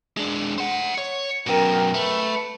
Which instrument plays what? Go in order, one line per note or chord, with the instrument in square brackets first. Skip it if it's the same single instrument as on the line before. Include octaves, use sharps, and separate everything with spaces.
[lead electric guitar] G#3 D4
C5 F#5
C#5
[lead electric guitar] F#2 B2 [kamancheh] A#4 G5
[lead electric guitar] A3 [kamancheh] B4 B5